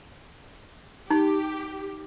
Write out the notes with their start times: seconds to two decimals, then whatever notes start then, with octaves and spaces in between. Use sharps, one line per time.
1.10 D#4 G4